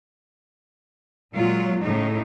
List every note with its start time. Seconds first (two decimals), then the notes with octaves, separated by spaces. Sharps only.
1.33 A#2 F#3 G#3 F4
1.81 A2 C#3 D#4